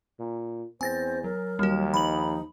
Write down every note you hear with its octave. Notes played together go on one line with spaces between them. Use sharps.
A#2
E2 C4 C5 G#5 A6 A#6
F#3 A#4
D#2 G3 F#4
F3 D#4 B5 F#7